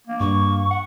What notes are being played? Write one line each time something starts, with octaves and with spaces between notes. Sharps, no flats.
A#3
G2 C#6
F#5